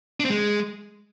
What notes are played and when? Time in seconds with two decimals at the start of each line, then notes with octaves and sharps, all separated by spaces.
0.20 D4
0.25 C4
0.30 G#3